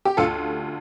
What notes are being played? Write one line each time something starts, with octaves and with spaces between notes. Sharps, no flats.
G4
D2 F4 A4